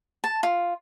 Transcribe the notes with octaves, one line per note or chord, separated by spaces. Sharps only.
A5
F4